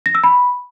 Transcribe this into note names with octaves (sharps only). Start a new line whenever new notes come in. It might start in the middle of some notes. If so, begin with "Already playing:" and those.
A#6
E6
B5